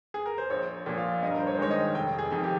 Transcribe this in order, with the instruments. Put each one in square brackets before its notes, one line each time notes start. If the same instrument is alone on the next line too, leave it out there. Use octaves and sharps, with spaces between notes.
[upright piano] G#4
A#4
C5
A#1 C#5
A#2 F3
F5
G2 D#5
A#4
C5
C#5
C5
D#3 G#3 D#4 C#5
D#5
F1 G5
G#4
F2 D#3 G#4
G4